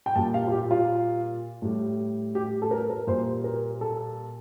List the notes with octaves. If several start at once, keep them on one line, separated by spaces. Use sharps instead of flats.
G5
A#2 G3 A5
F5
F4
G4
F4
A2 G3
G4
A4
A#4
A#4
A#2 G3 C5
A#4
A4